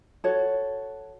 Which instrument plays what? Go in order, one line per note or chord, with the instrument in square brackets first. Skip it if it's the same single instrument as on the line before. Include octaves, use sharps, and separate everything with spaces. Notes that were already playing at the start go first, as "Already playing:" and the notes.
[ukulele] F#4 A4 C#5